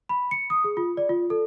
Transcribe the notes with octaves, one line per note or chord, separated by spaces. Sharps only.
B5
C#7
D#6
G#4
F4
D5
F4
A4